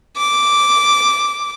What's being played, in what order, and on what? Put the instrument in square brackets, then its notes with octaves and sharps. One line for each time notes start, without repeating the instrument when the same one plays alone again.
[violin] D6